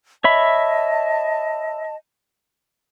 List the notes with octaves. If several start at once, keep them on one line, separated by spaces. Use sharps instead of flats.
C#5 D#5 E5 A5 B5